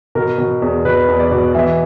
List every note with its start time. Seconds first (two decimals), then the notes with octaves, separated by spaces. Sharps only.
0.15 B2 A#4
0.38 B2
0.62 E2
0.85 B2 B4
1.08 E2
1.20 D5
1.32 B2
1.55 E3 E5